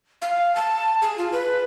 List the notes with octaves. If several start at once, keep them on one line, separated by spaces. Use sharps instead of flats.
F5
A5
G#4
F4
B4